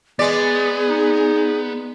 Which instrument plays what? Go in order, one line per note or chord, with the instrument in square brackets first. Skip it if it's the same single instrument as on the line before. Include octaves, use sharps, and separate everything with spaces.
[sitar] G#3 D5 [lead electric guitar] B3 [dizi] G#4
[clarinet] D#4